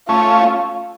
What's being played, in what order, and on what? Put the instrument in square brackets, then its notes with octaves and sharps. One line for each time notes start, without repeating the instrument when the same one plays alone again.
[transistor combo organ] A3 C#4 [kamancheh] F4